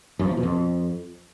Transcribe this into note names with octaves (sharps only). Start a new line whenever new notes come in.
F#2
F3
E2
B2
F2